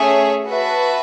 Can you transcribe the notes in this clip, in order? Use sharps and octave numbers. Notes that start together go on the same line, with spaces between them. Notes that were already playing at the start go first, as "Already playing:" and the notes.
Already playing: A3 C#4 G#4 C#5 E5
F#4 B4 E5 A5